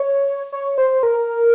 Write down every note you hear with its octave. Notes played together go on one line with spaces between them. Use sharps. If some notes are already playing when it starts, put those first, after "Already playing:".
Already playing: C#5
C#5
C5
A#4